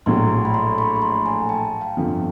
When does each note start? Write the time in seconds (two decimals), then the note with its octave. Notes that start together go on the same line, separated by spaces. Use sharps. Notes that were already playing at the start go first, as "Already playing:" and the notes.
0.06 A#1 A2 F#3 A#5 C6
0.45 B5
0.54 A#5 C6
0.78 B5 C#6
0.96 B5
1.02 A#5 C6
1.26 G#5 A#5
1.49 G5 A5
1.81 F5 G5
1.97 G1 F2 D3 F3